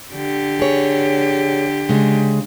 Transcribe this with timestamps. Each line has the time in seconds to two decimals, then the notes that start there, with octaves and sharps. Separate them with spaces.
0.13 D3 G4
0.59 G#4 C#5
1.89 C#3 G#3